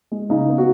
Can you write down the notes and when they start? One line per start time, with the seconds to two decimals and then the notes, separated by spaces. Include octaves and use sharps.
0.11 G#3
0.30 C#3 D#4
0.49 B3
0.58 F#4